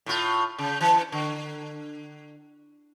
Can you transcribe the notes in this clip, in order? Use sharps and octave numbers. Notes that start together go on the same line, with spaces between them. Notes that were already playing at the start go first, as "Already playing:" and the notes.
A2 F4
C#3
E3
D3